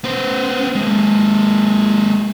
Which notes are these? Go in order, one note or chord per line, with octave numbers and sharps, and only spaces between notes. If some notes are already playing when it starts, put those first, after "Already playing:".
B3 C5
G#3 A#3